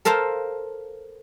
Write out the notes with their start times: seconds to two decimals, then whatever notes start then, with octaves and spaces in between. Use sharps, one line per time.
0.05 A4 A#4 C5 F5 A5